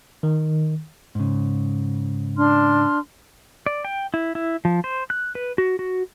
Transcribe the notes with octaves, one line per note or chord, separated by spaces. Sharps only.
D#3
G#2 C#3
D4 C6 F6
D5
G5
E4
E4
F3
C5
F#6
B4
F#4
F#4